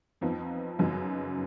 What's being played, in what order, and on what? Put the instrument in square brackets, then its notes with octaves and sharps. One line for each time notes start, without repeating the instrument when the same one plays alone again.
[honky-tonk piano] F2 F3 B3 D#4
F#2 C#3 F#3 B3 D#4